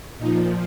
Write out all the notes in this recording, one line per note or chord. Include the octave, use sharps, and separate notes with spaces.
A#2 F3 D#4